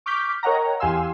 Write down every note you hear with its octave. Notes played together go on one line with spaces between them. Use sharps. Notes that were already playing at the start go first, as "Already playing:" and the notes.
C#6 D6 F6 G6 B6
A#4 C#5 D#5 F#5 G5 A#5
E2 G4 F5 G#5 C6 E6